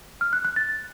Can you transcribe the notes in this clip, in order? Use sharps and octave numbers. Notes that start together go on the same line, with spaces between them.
F6
F#6
F#6
A6